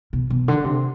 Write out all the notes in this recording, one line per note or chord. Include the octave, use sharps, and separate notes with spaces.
B2
B2
D3
C3